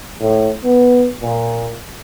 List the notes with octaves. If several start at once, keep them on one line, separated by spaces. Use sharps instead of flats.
A2
B3
A#2